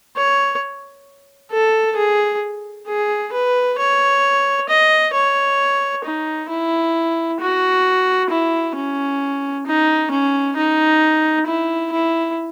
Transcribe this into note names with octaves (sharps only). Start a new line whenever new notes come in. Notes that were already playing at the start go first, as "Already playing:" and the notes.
C#5
A4
G#4
G#4
B4
C#5
D#5
C#5
D#4
E4
F#4
E4
C#4
D#4
C#4
D#4
E4
E4